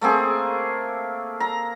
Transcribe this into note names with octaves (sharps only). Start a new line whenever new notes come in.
A3 A#3 C4 G#4
A#5